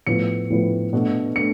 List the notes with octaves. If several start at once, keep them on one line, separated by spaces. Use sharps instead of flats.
A2 F3 B3 C#7
A2 F3 B3
B2 A3 D4
A3 D4 C#7